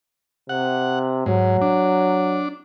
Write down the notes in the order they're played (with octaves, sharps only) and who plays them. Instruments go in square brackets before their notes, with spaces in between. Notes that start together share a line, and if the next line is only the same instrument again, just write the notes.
[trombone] C3 [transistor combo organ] F#5
[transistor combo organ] G#2 [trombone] F#3
[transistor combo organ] D4